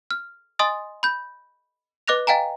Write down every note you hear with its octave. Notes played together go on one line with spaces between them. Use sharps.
F6
D#5 G#5 C6 D#6 A6
B5 G6
B4 D#5 D6 F#6 A#6 F7
D#5 F5 G5 G#5 A#5